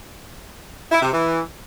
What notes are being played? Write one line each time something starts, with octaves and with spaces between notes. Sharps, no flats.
E4
C3
E3